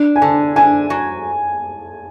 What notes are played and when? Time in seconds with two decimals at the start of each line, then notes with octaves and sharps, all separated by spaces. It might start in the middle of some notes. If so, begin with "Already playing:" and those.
Already playing: D4
0.16 G#5
0.22 D3 A5
0.56 D4 G#5
0.90 F#3